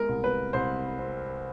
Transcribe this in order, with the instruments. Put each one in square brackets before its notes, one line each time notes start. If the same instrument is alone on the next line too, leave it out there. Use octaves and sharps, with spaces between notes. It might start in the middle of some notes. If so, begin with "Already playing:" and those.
Already playing: [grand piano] G#3 [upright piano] A#4
[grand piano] C2
[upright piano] B4
[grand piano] C2 [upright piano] C5
[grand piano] C4